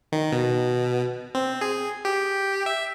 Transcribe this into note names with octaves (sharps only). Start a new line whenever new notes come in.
D#3
B2
C4
G#4
G4
E5